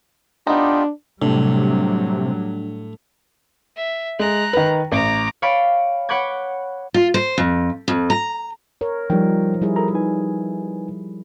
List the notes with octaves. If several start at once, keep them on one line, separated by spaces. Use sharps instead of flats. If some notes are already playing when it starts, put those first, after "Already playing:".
B3 D4 D#4 F4 G4
A2 C3 F#3 G3 D4
E5
G#3 A#5 F#6
D#3 B4
A1 A#5 D6
C#5 D5 F5 G5 B5
C#5 F#5 B5 D6 G6 G#6
F4
C5
F2
F2
A#5
A#4 C#5
F3 G3 D#4 A#4 G5
G3 E4 G#4
A4 A#4 A#5
D#4 B4 G#5